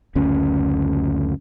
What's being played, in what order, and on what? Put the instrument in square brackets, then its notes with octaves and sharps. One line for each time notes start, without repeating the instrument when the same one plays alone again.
[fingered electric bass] F#1 D2 C#4